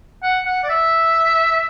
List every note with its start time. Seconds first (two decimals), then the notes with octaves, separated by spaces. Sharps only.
0.23 F#5
0.45 F#5
0.64 D5
0.69 E5